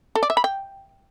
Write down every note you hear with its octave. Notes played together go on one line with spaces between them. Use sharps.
A4
D5
E5
B5
G5